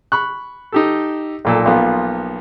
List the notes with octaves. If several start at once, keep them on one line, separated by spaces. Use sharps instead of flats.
B5 C#6 F#6
D#4 G4 A4
B1 A#2 A4
B1 F3 A#3 B3 F4